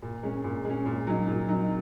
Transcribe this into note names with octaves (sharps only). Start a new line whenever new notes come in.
A#2
G#3 C#4
A#2
G#3 C#4
A#2
F#3 D#4
A#2
F#3 D#4